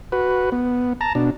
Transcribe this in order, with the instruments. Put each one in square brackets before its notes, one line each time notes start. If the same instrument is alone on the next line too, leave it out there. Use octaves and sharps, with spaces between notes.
[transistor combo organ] F#4 B4
B3
A5 A#5
B2 D4